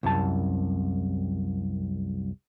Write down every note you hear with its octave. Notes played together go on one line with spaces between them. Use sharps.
C2 F#2 A5